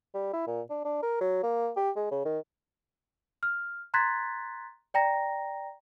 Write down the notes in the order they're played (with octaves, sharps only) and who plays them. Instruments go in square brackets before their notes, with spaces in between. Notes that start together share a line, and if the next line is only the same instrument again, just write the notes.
[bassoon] G3
E4
A#2
D4
D4
A#4
F#3
A#3
G4
G#3
C#3
D#3
[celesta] F6
A#5 C6 F#6 G#6 A6 B6
D5 G5 A#5 A#6